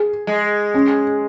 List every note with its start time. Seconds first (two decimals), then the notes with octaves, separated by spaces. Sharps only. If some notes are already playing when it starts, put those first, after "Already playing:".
Already playing: G#4
0.27 G#3
0.74 C#4